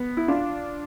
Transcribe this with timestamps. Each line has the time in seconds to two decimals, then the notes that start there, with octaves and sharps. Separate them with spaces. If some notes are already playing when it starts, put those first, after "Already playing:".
Already playing: B3
0.17 E4
0.28 D4 F4